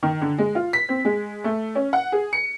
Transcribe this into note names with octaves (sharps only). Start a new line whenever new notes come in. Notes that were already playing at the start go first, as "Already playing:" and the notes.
D#3
D3
G#3
F4
B6
C4
G#3
A3
C#4
F#5
G#4
C#7